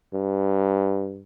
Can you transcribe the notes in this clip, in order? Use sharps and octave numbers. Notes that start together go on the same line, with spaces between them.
G2